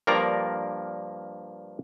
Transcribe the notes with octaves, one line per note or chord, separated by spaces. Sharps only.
G2 F3 A#3 A#4 D5 A#5